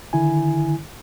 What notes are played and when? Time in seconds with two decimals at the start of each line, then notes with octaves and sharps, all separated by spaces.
0.13 D3 D#3 E4 G#5